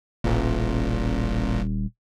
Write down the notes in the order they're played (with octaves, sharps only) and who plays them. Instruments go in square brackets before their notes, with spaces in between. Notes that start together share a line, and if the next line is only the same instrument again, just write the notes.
[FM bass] D#1 [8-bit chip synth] A1 A#2